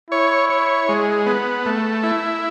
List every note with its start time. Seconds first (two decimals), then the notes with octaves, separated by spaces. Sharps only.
0.10 E4 C#5
0.50 C#5
0.89 G#3
1.26 B3
1.66 A3
2.03 E4